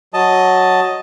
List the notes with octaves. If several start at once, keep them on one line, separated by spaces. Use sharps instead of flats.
F#3 D#5 A5